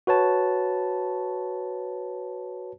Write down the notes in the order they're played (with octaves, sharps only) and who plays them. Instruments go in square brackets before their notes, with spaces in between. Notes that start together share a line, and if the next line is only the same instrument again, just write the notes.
[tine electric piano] F#4 B4 C#5 A5